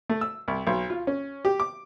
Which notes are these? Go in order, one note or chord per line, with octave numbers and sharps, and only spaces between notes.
A3
E6
C2
B1
F4
C#4
G4
D6